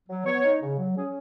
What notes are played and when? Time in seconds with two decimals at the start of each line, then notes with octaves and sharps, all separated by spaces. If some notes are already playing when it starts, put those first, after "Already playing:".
0.09 F#3
0.26 B3 C#5
0.44 D#4
0.62 C#3
0.78 F#3
0.97 C#4 G#4